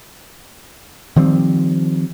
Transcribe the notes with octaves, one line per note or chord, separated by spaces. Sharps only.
D#3 F3 G3 C4